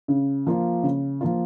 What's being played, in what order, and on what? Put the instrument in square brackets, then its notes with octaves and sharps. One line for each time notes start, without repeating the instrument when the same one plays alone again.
[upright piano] C#3
F3 A#3 F4
C#3
F3 A#3 F4